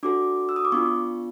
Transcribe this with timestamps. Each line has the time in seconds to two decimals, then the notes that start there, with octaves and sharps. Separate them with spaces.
0.03 D4 F#4 A4 D6
0.49 E6
0.56 D#6
0.65 D6
0.72 B3 D4 F4 C#6